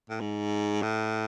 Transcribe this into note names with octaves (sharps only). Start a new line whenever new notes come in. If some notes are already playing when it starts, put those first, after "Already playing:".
A2
G#2
A2